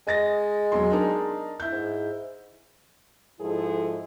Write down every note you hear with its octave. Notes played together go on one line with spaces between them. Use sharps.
G#3 D#5 A6 A#6
E1 F#3 C6
D4 D#4 A#4
E4 G6
G#2
G#2 F3 E4 G#4 A4